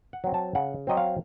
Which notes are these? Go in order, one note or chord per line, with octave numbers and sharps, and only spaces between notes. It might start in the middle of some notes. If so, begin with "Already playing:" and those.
F#5
F#3 C4
A5
C#3 F#5
F#3 C4 D#5
F5